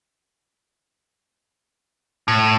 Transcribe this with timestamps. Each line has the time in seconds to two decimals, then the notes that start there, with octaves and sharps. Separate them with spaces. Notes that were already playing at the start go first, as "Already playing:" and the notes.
2.28 A2